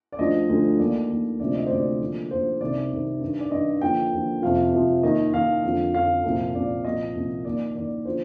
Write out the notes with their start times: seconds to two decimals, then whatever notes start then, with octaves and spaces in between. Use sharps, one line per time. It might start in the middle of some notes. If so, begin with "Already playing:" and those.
0.12 D5
0.19 D2 D3 F3 D#5
0.49 D2 D3 F3
0.79 D#2 D#3 D5
1.10 D#2 D#3
1.40 D2 C3 F3 D5
1.55 D#5
1.66 C5
1.70 D2 C3 F3 D5
2.00 D#2 D3 F3
2.31 D#2 D3 F3 C5
2.61 C2 C3 D#3 D5
2.92 C2 C3 D#3
3.21 G2 D#3
3.40 D5
3.51 G2 D#3 D#5
3.81 D#2 D3 F3 G5
4.12 D#2 D3 F3
4.42 F2 C3 F3 F5
4.73 F2 C3 F3
5.03 D#2 D#3 D#5
5.33 D#2 D#3 F5
5.64 F2 D3 F3
5.94 F2 D3 F3 F5
6.24 C2 A#2 F3
6.55 C2 A#2 F3 D5
6.84 C2 A#2 F3 D#5
7.15 C2 A#2 F3
7.45 D#2 D#3 D5
7.75 D#2 D#3 D5
8.05 D3 F3 C5